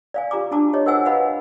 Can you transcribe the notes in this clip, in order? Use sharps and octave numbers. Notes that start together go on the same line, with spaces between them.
D5 F5 G#5
F4 G4 A#5 D6
D4 F#4 A5 A#5 D6
G4 C#5 D#5
F#4 A#4 C5 F#5 G#5 E6
B4 D#5 F5 F#5 G#5 B5